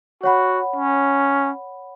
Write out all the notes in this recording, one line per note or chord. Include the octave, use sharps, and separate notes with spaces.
F#4 C#5 F#5 B5
C#4